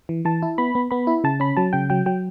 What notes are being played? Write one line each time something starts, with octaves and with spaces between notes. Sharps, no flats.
E3
E3 A5
E4
B3 B5
B3
B3 B5
E4
C#3 A5
C#4 B5
F#3 A5
C#3 G5
F#3 G5
F#3 G5